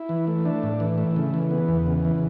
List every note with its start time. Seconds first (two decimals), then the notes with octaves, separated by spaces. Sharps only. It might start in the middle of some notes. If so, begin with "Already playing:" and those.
Already playing: E4
0.09 E3
0.27 A3
0.45 D4
0.63 A2
0.80 E3
0.98 A3
1.16 C#3
1.34 E3
1.51 B3
1.68 E2
1.86 C#3
2.05 E3